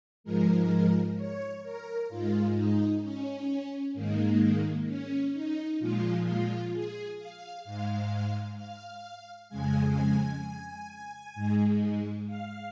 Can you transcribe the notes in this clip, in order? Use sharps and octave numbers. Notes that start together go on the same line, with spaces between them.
G#2 F3 G#3 A#4
C#5
A#4
G#2 G#3 F4
D#4
C#4
G#2 D#3 G#3 A#3
C#4
D#4
A#2 F3 G#3 F4
F4
G#4
F5
G#2 G#3 F5
F5
F2 C#3 G#3 G#5
G#2 G#3
F5